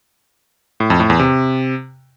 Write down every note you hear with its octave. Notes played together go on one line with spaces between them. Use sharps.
A2
F2
A2
E2
C3